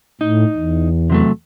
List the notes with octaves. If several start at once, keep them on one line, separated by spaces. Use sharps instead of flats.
A2 D#4
E2
C3 F#3 A3